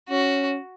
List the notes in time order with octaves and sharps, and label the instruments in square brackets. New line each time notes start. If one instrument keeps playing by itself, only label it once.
[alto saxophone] C#4 [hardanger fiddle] F#4